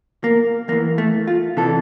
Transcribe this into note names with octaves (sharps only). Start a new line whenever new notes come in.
A#3
E2 E3 A#3
A3
F4
C3 E3 A4